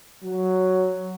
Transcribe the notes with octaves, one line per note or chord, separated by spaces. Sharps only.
F#3